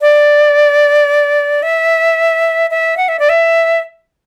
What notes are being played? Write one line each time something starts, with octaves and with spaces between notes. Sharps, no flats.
D5
E5
E5
F#5
E5
D5
E5